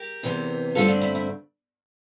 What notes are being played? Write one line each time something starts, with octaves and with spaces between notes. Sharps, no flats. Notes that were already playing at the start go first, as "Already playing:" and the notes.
Already playing: G4 A#4
E2 C3 E3
G2 D3 A3 C4 F4 A4
D4
E4
E4